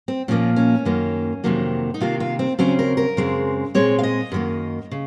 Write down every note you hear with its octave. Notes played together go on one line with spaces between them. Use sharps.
C4
A#2 F3 A#3 C#4
C#4
F#2 D#3 A#3
F2 C3 D#3 F#3 A#3
D#4
C3 D#3 A#3 F4
F4
C4
D#2 C#3 F#3 C4 C#4
A#4
A#4
F#2 C#3 G#3 C4
A#2 G#3 C4 C#5
F5
D#5
F#2 D#3 A#3
C#3